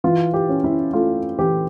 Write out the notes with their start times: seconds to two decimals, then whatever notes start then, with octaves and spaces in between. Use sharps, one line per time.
0.04 E3 F4
0.34 G4
0.49 C#4
0.64 E4
0.93 A3 F4
1.39 E3 G4